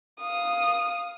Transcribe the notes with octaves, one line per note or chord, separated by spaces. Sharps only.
F5 D#6